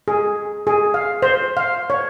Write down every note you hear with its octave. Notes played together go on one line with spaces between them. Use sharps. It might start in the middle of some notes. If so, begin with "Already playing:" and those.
G#4
G#4
F5
C5
F5
C#5